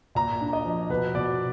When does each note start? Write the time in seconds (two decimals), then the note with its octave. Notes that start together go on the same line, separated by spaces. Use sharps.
0.15 A#2 A#5
0.41 D4
0.53 D#5
0.65 F3
0.89 B2 B4
1.15 B2 D5